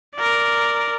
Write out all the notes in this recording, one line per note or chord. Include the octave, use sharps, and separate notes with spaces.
A#4 D5